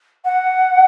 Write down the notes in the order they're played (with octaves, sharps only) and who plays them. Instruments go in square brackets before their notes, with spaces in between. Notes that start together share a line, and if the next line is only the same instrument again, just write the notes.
[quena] F#5